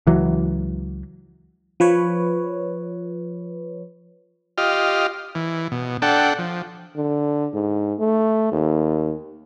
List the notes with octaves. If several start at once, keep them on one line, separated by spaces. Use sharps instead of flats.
C#2 E3 F#3
F3 B4 C#5
F4 G4 D#5 F6
E3
B2
D4 A4 F#5 G5
F3
D3
G#2
A3
D#2